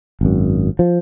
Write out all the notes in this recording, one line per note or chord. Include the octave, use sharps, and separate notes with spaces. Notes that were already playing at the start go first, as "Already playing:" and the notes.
G#1 F#2
F3